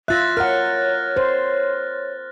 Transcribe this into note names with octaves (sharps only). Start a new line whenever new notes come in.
F4 E5 F#6 A6 A#6
A#4 C#5 F#5 F6
C5